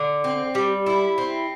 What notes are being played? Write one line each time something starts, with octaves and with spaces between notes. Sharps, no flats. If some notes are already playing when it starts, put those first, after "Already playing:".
Already playing: D3
C4
G3
E4
C4